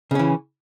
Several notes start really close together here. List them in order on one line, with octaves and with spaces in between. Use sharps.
C#3 C#4 E3